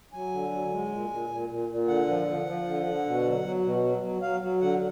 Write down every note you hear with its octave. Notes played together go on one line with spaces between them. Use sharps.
F#3 G#5
D3
F#3
G#3
A#2
A#2
A#2
A#2
A#2
D3 F#5
F3
F3
F3
D3
D3
B2
F#3
F#3
B2
F#3
F#3
F#3 F5
F#3
D3 F#5